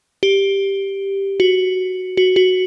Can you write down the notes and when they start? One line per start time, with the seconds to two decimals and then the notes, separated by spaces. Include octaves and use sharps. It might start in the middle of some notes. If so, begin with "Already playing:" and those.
0.23 G4
1.40 F#4
2.17 F#4
2.36 F#4